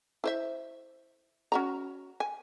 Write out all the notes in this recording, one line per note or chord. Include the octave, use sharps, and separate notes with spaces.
E4 C5 E5
C#4 F#4 A#5
G#5